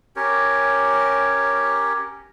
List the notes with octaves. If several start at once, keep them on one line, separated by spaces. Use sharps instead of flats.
C#4 G4 A#4 C#5